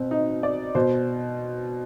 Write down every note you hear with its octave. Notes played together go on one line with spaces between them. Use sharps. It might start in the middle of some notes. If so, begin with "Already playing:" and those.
Already playing: B2 C4
D#4
D5
B2 C5